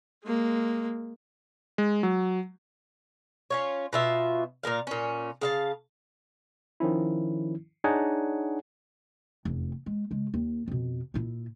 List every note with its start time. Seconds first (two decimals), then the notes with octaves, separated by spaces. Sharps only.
0.25 G#3 A#3
1.78 G#3
2.03 F#3
3.50 C#4 F4 C#5
3.93 B2 F4 E5
4.63 A#2 F3 A#4 F5
4.87 A#2 C#4
5.42 C#3 F5 A5
6.80 D#3 F3 C#4 E4
7.84 D4 D#4 G#4 C#5 F#5 G#5
9.45 F1 E2
9.86 G#3
10.11 C#3 G#3
10.34 D#2 D#3
10.68 F2 B2
11.14 A#2 E4